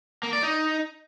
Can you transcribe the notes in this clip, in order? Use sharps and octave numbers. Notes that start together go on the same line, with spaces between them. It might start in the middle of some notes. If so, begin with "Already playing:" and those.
A#3
D5
D#4